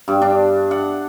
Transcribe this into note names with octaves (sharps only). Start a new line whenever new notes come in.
G2
D4
F#5